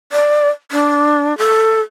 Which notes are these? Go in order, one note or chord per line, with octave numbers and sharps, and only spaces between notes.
D5
D4
A4